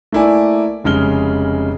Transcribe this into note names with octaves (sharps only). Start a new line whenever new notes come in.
A3 A#3 E4 D5 G#5
F1 C#3 G#3 F6 G7